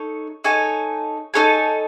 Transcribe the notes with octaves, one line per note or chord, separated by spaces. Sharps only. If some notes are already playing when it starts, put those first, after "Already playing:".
Already playing: D#4 A4 C#5
D#4 A4 C#5 G#5
D#4 A4 C#5 G#5